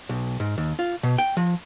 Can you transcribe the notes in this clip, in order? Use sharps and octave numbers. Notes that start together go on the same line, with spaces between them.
B1
G#2
D#2
F4
B2
G5
F3